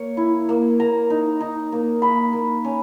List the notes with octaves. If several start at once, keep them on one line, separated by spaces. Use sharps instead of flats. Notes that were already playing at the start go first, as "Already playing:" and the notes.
Already playing: A#3 C#5
E4
A#3
A#3 A#5
D#4
D#4
A#3
A#3 B5
A#3
C#4